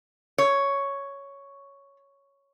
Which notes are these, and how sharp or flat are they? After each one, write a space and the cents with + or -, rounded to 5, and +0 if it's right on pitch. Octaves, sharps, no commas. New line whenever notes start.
C#5 +5